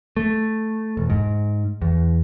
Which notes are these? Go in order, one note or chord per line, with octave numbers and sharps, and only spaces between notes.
A3
E1
G#2
E2